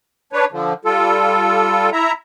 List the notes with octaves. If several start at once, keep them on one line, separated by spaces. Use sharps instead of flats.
D4 B4 C#5
D3 F3
G3 F4 A4
E4 E5 A#5